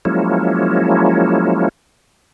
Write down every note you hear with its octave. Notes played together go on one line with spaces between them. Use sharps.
F3 F#3 G#3 A#3 C#4 E4